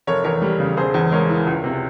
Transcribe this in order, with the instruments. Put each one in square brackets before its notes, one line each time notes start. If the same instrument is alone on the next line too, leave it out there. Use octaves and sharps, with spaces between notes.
[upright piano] F1 A#4 C#5
E2 A#4 C#5
G3
C#3
E1 G#4 C5
E2
G#3 A#4 C#5
E3
C#2
C3